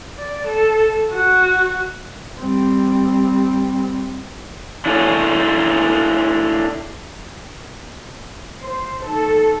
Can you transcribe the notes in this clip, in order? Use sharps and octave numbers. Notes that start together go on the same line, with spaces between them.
D5
A4
F#4
G3 C4
D4 E4 G#4 A4 C#5
C5
D#3 A4